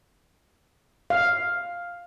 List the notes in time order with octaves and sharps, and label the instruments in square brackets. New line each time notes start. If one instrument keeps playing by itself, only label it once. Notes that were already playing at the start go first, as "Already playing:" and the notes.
[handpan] F5